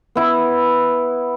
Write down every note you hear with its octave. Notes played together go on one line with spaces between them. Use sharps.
B3 E4